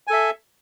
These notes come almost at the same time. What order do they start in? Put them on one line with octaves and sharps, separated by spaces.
G#5 A4 E5